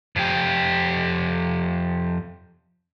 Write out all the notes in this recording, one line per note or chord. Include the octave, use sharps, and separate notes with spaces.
F2 G4